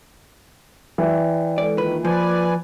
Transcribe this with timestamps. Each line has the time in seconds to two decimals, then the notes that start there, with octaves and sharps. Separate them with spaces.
0.98 E3 D5 G5
1.58 G#3 A4 D5
1.78 D#3 A#3 F4 B4
2.05 F3 B4 D5 G#5